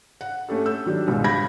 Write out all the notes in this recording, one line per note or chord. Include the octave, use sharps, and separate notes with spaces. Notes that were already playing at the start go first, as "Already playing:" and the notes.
F#5
A3 C#4 G4 A4
E6 G6
D#3 F#3 D4 G4
C#2 G#2 B2 G3 G#3
B5 G6 G#6 A#6